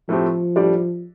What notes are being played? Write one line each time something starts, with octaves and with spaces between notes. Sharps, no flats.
A2 F3 A3 C4 G4
A2 G3 D4 G4 D5